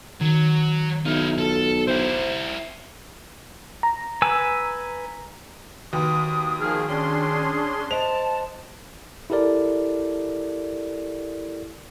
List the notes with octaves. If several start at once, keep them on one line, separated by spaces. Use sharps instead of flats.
D#3 F#3
B1 D#4 E4 F5
F4 A4
E4 G4 C5
A#5
B4 G#5 E6
D#2 F#4 B4 D#6
D#3 F3 G#4 F6
C#4 D4 G#4 C6
C5 D#5 A5 F7
E4 G4 A4 A#4 D5